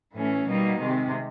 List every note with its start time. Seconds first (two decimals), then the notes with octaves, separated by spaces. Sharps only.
0.13 A2 E3 A3 C#4
0.46 B2 G3 A#3 D#4
0.78 C3 D#3 G#3